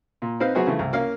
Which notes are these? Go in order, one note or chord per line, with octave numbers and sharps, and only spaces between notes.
A#2
C4 D#4 B4 C5 F5
F#3 B3 F#4 G#4 C5
C#3 E3 A3
C2
A#3 C#4 F5